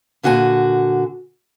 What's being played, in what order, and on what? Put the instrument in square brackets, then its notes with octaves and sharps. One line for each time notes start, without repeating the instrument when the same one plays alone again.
[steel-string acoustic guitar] A#2 D3 F#4 D5 G#5